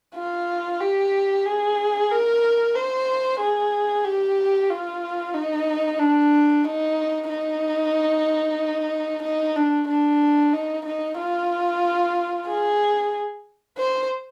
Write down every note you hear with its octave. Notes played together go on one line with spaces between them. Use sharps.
F4
G4
G#4
A#4
C5
G#4
G4
F4
D#4
D4
D#4
D#4
D#4
D4
D4
D#4
D#4
F4
G#4
C5